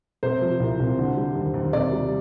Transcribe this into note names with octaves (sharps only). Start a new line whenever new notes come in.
C3 C5
F3
C2
C2
D3
G3
D#2
D#2
C3 D5
G3